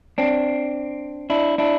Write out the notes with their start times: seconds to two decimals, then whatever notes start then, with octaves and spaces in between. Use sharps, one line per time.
0.18 C4 D4
1.30 D4 E4
1.58 D4 E4